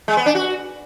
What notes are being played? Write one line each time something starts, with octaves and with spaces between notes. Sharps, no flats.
G#3
B3
D4
F#4